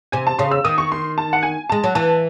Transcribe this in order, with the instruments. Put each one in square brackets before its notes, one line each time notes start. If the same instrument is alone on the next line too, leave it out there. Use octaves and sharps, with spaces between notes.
[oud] C3 [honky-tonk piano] G#5
[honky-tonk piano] A5
[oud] C#3 [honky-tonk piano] C6
[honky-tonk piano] E6
[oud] D#3 [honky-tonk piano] D#6
[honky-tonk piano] C#6
C6
A5
F#5
G#5
[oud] G#3 [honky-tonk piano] A5
[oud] F#3
[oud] E3 [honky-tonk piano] A5